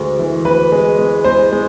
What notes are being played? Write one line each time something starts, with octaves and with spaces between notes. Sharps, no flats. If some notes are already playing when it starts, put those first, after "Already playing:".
Already playing: D2 G#3
E3
D2 B4
G#3
G#3
G#3 C5
G#3